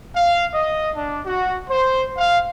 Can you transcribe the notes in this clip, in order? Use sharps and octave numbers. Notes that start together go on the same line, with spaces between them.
F5
D#5
D4
F#4
C5
F5